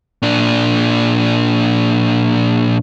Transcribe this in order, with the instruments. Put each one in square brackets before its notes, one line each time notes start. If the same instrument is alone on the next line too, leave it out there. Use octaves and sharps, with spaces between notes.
[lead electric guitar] A#2 D4